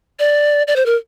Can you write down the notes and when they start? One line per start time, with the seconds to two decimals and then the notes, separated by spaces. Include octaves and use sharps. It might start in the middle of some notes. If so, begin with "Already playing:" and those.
0.19 D5
0.68 D5
0.76 C5
0.86 A#4